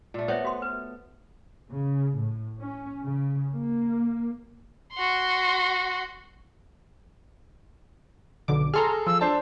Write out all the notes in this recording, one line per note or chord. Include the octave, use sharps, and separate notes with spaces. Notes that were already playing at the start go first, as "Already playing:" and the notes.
A#2 A3
B3 C5 C#5 E5
F#4 C6
B4
C#3
A2
C#4
C#3
A#3
F#4 C6
B1 D3 D6
G#4 A4 A#5 C6 F6
F3 E6
D4 C5 A5